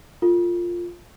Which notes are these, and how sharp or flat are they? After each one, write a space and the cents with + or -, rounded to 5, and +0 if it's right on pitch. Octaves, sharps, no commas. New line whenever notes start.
F4 +0 A4 +35